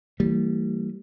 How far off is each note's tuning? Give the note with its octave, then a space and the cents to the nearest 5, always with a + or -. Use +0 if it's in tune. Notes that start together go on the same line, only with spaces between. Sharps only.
E3 +0 G3 -15 A#3 -40